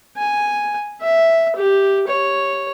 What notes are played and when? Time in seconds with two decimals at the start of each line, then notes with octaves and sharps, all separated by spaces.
0.18 G#5
1.02 E5
1.56 G4
2.08 C#5